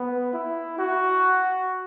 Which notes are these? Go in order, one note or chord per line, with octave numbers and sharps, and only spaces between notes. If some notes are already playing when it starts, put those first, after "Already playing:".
Already playing: B3
E4
F#4